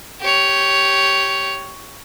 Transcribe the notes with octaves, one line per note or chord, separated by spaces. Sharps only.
G4 C#5